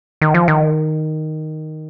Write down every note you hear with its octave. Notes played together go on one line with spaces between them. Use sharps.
D#3
F3
D#3